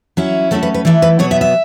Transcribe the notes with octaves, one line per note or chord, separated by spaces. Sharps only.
F#3 C#4 E4
F#3 A3 C#4 E4 A4
B4
B4
E3 A3 E4 D5
B4
B2 F#3 B3 C#5
E5
E5